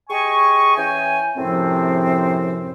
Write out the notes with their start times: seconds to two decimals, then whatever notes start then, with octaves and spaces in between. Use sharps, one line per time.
0.10 G4 G#4 D#5 G#5 C#6
0.76 E3 C#4 G5 G#5
1.36 F#2 A2 C3 F3 C4